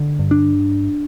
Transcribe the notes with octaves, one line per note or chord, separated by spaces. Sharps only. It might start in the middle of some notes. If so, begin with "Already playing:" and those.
Already playing: D3
G2
D4